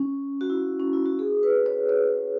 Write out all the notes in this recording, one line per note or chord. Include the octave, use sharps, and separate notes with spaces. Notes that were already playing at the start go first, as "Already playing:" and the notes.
Already playing: C#4
F#4
E4
C#4
E4
F#4
G#4
B4
C#5
C#5